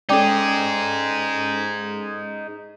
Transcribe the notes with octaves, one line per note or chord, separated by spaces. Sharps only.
G#3 C#4 D#4 G#4 A4 D5 G5 D6